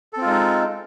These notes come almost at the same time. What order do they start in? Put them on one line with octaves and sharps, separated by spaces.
A4 C4 F4 G#3 D#4